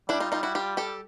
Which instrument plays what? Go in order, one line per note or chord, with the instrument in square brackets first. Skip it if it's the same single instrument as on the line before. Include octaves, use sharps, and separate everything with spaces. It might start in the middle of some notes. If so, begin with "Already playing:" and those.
[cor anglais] G3 [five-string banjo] D4 E4
[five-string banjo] D#4 F4
D#4 F4
E4 F#4
F4 G4
G4 A4